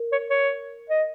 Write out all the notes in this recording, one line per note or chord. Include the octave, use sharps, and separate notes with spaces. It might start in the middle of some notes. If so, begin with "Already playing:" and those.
Already playing: A#4
C#5
C#5
D#5